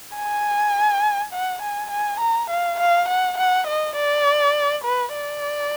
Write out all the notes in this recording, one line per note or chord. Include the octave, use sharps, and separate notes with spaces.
G#5
F#5
G#5
G#5
A#5
F5
F5
F#5
F#5
D#5
D5
B4
D5